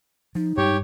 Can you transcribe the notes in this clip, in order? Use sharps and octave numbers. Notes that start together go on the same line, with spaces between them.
F3 D#4
G2 G3 G#3 G4 C#5